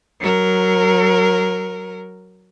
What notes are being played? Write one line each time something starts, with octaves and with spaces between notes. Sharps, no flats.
F#3 A#4